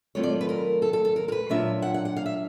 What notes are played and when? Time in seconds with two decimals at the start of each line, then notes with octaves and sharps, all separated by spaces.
0.15 D#3 F#3 A3 C4 F4 C#5
0.23 D5
0.41 B4
0.49 A#4
0.82 A4
0.93 A4
1.05 A4
1.16 A#4
1.28 A#4
1.32 B4
1.49 A#2 F#3 A#3 D4 F4 E5
1.82 F#5
1.94 F#5
2.05 F#5
2.16 F5
2.26 E5